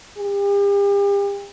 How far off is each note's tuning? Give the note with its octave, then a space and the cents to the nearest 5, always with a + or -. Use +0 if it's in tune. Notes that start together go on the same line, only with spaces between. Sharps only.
G4 +40